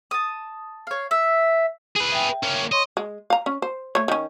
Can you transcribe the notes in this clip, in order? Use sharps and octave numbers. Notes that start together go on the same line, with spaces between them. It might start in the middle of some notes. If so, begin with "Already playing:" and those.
A5 D#6
C#5 F5
E5
G#4 B4
E5 G5
A#3 C#4
C#5 D#5 C6 C#6
G#3
F5 A#5
C#4
C5
A3 C#5
D#3 C#4